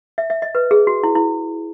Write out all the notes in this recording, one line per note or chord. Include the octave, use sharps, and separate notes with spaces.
E5
E5
D#5
B4
G#4
F#4
E4
E4